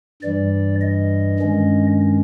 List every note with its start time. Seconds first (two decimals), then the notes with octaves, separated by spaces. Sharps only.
0.22 G2 E3 G3 D5
0.81 D#5
1.39 G2 D#3 G#3 C#4